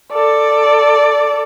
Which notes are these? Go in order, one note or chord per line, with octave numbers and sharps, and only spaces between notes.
A4 D5